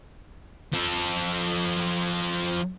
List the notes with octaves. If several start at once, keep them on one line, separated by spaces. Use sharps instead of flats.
F3 A4